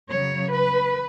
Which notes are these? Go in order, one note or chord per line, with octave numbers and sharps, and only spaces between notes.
C#3 F#3 C#5
B4